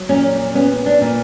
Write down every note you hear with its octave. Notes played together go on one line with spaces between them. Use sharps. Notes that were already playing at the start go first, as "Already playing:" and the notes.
Already playing: F#3
A#2 C#4
B3 C#4
D4
A#2